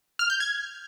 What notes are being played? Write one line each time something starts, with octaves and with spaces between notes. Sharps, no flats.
F6
G6
G#6